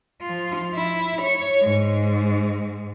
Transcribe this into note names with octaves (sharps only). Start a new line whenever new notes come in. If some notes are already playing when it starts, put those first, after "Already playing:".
F3 F4
E4
C#5
G#2